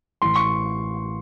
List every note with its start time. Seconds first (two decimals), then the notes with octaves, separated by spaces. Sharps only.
0.22 A1 C6
0.36 C#6